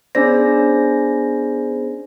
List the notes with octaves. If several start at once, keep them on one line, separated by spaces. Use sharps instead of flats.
B3 C#4 D4 G#4 C5 D5 A#6